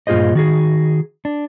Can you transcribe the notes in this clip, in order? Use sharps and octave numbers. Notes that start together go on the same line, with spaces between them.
G2 A#2 F4 G#4 C5 D#5
D#3 F#4 G#4
D4